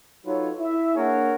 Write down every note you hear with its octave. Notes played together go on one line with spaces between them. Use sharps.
F#3 D#4 F4 A4 B4 C#5
E4 E5
A#3 D4 G#4 A#4 C#5 F#5